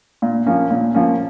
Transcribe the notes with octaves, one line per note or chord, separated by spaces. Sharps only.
A#2
F3 A#3 C#4
A#2
F3 A#3 C#4